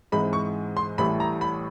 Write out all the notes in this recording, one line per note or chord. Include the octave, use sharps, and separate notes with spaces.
G#2 E3 G#3 C4 D#4 B5
C#6
C6
A1 A2 E3 G3 B5
A#5
B5